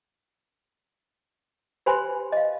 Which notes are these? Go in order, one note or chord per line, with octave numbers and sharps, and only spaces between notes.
G4 B4 C5 G#5 B5 C6
D#5 F5